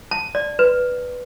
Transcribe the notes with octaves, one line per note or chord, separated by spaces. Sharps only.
A5
D5
B4